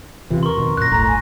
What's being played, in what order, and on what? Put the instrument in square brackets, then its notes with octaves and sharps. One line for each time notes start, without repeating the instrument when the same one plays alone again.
[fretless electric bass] E2 C3 E3 [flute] F4
[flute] A#4 [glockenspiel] C6 C#6
[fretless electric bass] F2 B2 D#3
[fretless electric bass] F#2 A#2 [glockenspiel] F#6 A#6
[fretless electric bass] D1 G1 A2 [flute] A#5
[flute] G#5